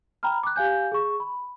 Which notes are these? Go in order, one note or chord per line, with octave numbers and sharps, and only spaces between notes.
G5 A#5 B5 F6
D6 F#6
G4 F5 G#5 G6
G#4 C#6
B5